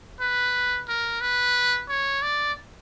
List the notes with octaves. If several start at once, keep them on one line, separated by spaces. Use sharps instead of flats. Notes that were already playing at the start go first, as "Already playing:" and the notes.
B4
A#4
B4
C#5
D5